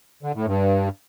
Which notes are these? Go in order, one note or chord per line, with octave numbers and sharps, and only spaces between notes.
D3
A2
G2